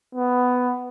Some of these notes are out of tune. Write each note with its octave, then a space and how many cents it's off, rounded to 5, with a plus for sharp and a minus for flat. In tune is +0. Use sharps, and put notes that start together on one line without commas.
B3 +10